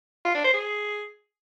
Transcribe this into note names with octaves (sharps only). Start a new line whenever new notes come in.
F4
D4
C5
G#4